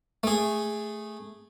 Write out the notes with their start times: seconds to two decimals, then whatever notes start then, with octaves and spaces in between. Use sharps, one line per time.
0.23 A3 G#4